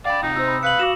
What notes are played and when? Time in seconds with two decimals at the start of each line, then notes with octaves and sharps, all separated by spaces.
0.05 D5 F5 G5 B5
0.23 C3 D#4 F4 D#6
0.36 C3 C4 E6
0.48 B5
0.63 B4 F5 C#7 F#7
0.79 F#4 D6 A#6 E7